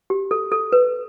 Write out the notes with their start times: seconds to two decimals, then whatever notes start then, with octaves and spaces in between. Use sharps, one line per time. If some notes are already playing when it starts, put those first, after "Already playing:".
0.10 G4
0.31 A4
0.52 A4
0.72 B4